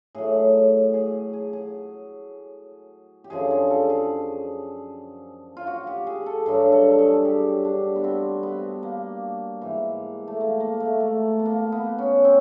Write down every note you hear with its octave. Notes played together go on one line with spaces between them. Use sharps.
A2 F#3 G#4
G#4
G#4
G#4
G4
F#2 D3 F3 G#4
G#4
A4
G#4
F4
F#4
G4
G#4
A4
G2 D3 F#3 G#4
A4
A4
G#4
G4
D4
B3
C4
B3
A#3
G#2 E3
A3
A#3
A#3
A3
A3
B3
A#3
B3
C#4
C4